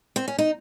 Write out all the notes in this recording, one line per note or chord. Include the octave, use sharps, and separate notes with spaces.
C4
C#4
D#4